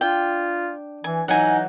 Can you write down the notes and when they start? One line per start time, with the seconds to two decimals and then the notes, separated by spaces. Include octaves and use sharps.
0.01 D4 F4 G5
1.04 E3 G#5
1.28 E3 F#3 D#4 F#5 G#5